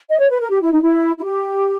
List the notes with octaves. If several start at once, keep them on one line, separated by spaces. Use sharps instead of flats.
D#5
C#5
B4
A#4
G4
E4
D#4
E4
E4
G4